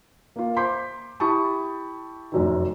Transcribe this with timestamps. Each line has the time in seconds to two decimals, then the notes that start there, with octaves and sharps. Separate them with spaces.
0.36 A#3 F4
0.57 C5 C6 D6 G6 B6
1.20 E4 G4 A5 B5 C#6 D#6
2.32 F1 F#2 D#3